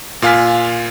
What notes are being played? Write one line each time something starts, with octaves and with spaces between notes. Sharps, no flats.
A#2 F4 F5 G#5 F6 B6